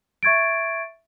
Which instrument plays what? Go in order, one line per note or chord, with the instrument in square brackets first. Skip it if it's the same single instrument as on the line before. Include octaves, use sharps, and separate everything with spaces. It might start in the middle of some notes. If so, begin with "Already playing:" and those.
[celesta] E5 C#6 G#6 A6 D7